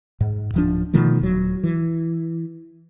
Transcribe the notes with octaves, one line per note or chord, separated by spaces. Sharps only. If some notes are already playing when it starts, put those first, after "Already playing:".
G#2
D1 F3 D4
B2 D#3 F3 A3
D#1 F#3
E3